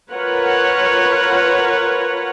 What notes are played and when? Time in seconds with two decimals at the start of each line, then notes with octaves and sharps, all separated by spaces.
0.12 F4 A#4 B4 C#5 F#5